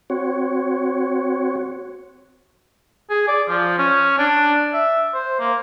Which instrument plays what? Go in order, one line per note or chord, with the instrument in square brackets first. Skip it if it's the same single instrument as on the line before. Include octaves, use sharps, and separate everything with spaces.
[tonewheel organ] C4 F#4 C#5
[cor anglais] G#4
D5
F3
C#4
D4
E5
C5
A#3